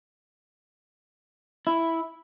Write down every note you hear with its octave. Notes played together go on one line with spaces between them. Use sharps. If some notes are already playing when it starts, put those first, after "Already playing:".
E4